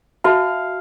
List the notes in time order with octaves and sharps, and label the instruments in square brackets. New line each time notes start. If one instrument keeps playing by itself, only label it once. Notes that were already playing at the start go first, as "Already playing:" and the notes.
[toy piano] F#4 E5 A5 [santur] F5